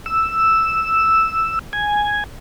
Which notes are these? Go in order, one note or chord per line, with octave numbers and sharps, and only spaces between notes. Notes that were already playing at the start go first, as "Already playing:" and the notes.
E6
G#5